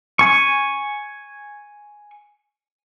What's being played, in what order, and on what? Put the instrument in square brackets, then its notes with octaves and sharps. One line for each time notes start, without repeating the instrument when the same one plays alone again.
[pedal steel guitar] G#5 C#6